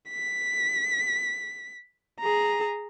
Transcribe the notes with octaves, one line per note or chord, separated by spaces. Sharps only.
B6
G#4 A#5